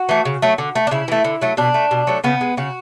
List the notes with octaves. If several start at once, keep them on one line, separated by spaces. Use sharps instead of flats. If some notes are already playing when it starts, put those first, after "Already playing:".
Already playing: F#4
E3 A3
C#3
F#3 A3
D3
A3
D4
C#3 E4
E3 A3
D3
F#3 A3
B2 D4
A3
B2
F#3 A3
C#3 B3
G#3
C#3 F#4